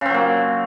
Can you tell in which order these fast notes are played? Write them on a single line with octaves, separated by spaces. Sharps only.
C#3 C4 F#3 A#3